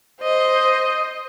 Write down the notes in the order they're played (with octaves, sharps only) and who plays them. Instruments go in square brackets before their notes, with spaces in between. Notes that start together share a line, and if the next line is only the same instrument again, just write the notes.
[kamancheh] C5 D#5